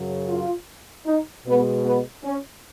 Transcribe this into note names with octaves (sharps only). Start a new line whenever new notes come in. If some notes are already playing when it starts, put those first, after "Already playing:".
Already playing: F#2 C#3 F#3
F4
D#4
B2 G#3 B3
B3
C#4